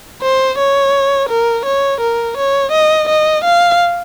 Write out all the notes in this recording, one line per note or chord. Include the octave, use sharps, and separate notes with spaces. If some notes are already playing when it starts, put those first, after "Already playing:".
C5
C#5
A#4
C#5
A#4
C#5
D#5
D#5
F5